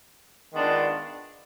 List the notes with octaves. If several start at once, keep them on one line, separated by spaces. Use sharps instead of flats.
D#3 G#3 B3 D4 F4